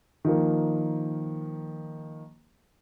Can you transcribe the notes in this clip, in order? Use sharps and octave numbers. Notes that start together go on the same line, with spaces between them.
D#3 F3 A#3